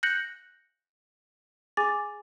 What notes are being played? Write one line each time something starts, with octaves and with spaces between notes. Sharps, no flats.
F#6 G6 A#6 C#7 F#7
G#4 G#5 D6 A6